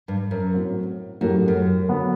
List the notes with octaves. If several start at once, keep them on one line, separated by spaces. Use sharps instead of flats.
G2
F#2
A2 F#3 C4 F#4
F#2 A2 F#3 A3 E4 G4
F#2
D3 F#3 B3